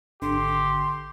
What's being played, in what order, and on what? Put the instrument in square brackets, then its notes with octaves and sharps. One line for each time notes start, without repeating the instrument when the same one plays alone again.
[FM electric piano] G#1 D3 [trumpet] G4 [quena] C6